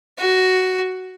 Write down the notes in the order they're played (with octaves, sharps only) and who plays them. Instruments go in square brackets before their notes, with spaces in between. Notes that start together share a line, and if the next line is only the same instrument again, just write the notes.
[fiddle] F#4